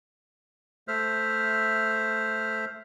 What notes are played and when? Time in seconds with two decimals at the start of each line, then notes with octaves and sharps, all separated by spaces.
0.88 A3 C5 E5 F6